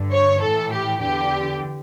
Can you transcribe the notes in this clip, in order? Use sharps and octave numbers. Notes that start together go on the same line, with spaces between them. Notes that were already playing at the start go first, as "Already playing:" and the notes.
Already playing: G2 D3
C#5
A2 E3 A4
G4
E2 D3 G4